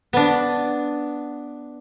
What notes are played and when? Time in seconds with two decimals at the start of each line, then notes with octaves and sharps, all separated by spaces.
0.13 B3 D4